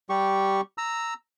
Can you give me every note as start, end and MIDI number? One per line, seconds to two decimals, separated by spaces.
0.09 0.61 55
0.09 0.61 67
0.09 0.61 85
0.78 1.14 82
0.78 1.14 88